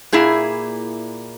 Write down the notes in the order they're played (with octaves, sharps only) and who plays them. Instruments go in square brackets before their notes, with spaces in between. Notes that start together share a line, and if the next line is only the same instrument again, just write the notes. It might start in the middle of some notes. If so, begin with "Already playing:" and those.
[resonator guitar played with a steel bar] A#2 A#3 E4 G#4